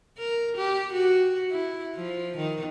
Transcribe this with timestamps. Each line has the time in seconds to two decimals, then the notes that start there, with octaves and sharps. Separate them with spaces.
0.18 A#4
0.57 G4
0.93 F#4
1.51 E4
1.95 F3
2.37 D#3